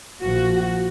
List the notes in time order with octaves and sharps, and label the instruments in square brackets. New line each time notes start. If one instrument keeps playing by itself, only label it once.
[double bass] A#1 F3 [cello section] F#4